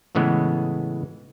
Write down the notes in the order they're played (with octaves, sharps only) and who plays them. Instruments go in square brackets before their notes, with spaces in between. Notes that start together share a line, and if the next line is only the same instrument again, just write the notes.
[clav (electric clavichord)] A2 C#3 E3 G#3 B3